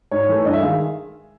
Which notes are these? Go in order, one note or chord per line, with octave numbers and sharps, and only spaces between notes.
G#2 C#5
E3 A3
G2 D#5
E5
D#3 G#3 F5